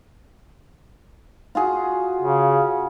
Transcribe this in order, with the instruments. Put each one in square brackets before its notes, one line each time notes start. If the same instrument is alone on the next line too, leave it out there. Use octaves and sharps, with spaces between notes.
[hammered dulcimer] F4 F#4 G#4
[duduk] C#3